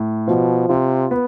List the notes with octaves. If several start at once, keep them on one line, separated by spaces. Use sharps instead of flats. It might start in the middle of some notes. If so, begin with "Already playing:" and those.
Already playing: A2
B2 F3
C3 F4
B3